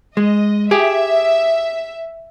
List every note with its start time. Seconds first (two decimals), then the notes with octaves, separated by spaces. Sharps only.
0.17 G#3 D#5
0.71 G4 G#4 E5